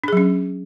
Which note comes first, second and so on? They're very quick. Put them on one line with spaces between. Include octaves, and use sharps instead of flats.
D4 G#4 F#3 C#4